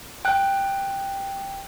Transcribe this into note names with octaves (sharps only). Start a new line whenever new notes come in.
G5 F#6